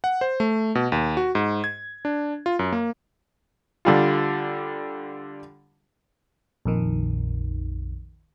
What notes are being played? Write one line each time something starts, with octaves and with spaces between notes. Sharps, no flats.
F#5
C5
A3
B2
D#2
F#4
G#2
G#6
D4
F4
F#2
A#3
D3 G3 F4
A#1 F2 D#3